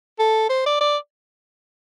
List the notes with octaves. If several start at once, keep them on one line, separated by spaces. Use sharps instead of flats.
A4
C5
D5
D5